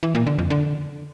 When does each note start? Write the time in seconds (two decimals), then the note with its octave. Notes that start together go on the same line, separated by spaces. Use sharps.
0.03 E3
0.15 A#2
0.27 D3
0.38 F2
0.50 D3